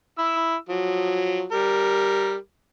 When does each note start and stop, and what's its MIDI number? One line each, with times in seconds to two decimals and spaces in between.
0.18 0.55 64
0.18 0.55 88
0.69 1.46 53
0.69 1.46 54
1.52 2.35 55
1.52 2.35 70